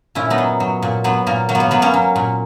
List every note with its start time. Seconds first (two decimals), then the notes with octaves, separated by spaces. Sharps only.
0.15 A#2 C#4 E4
0.30 B3 D#4
0.38 F#3
0.60 F#3
0.82 A#2
1.04 F#3 B3
1.27 A#2 A#3
1.49 F#3 A#3
1.55 B3
1.60 A#3
1.71 F#3 B3
1.82 A#3 C#4
1.94 F#3
2.16 A#2